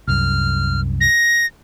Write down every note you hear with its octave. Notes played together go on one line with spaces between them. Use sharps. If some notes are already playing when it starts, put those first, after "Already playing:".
C2 F#2 F6
A#6